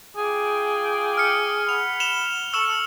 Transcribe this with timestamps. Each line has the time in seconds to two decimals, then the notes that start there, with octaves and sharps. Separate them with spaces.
0.17 F4 G#4 G5 D6
1.18 F6 C#7
1.69 F#5 B5 F7
2.00 E7 F7 G7
2.54 A4 C#6 E6 E7